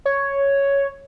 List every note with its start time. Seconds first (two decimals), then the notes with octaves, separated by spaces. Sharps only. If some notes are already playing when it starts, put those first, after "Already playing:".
0.06 C#5